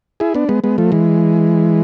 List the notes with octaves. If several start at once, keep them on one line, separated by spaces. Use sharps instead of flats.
E4 G#4
B3 D4
G#3 B3
G#3 B3
F3 A3
E3 G#3